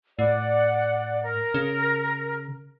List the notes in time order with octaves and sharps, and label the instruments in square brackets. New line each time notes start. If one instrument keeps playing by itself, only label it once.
[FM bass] A2 [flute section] D5 F#5
[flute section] A#4
[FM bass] C#3